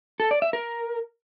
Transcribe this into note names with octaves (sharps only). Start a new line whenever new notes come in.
A4
D5
E5
A#4